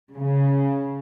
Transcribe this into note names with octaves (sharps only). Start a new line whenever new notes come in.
C#3